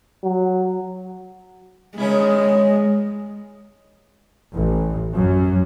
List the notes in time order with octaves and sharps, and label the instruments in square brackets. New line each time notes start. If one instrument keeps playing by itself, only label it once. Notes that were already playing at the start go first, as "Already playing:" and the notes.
[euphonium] F#3
[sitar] D#3 C#4 E4 [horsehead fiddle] G#3
[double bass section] A1
F#2